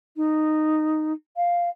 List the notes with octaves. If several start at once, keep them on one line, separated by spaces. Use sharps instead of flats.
D#4
F5